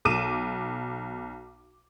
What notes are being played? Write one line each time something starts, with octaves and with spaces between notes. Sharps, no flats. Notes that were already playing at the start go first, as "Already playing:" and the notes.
B1 D6 D#7 E7